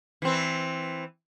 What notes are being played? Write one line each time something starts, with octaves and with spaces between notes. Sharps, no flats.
E3 C4